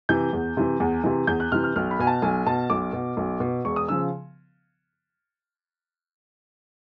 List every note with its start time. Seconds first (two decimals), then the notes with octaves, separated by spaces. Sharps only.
0.09 C3 E3 G6
0.33 E2
0.57 C3 E3
0.80 E2
1.04 C3 E3
1.27 E2 G6
1.40 F#6
1.52 C3 E3 F6
1.64 F6
1.76 B1 F6
1.91 B5
1.99 B2 G#5
2.07 A5
2.22 B1 G#5
2.47 B2 A5
2.70 B1 D6
2.93 B2
3.17 B1
3.40 B2
3.65 E1 C#6
3.76 D#6
3.88 C#3 F3 E6